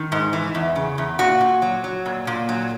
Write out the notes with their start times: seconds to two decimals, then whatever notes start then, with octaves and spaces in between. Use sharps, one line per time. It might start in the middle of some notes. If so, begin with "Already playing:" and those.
Already playing: D#3
0.12 G#2
0.33 E3
0.55 E2
0.76 C#3
0.98 E2
1.19 A#2 F#4
1.41 A#2
1.62 F#3
1.84 F#3
2.06 A#2
2.27 A#2
2.49 F#3